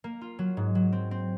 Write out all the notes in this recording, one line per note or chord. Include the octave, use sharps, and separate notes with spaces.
A#3
F4
F#3
G#2
F#3
C4
C4